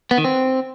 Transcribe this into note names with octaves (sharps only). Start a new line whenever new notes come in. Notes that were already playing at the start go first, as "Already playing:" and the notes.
B3
D#3
C4